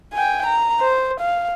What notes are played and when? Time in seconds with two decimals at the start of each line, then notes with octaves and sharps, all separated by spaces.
0.13 G5 G#5
0.47 A#5
0.80 C5
1.21 F5